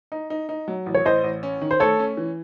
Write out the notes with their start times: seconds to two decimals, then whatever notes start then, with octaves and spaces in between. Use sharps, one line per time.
0.12 D#4
0.30 D#4
0.49 D#4
0.68 F#3
0.86 A1
0.94 C#5
1.05 A1 C5 D#5
1.24 A1
1.43 C#4
1.62 D#3
1.71 C5
1.80 A3 A4 C#5
1.99 C#4
2.17 E3